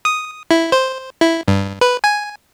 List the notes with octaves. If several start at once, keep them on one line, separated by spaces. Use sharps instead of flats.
D#6
E4
C5
E4
G2
B4
G#5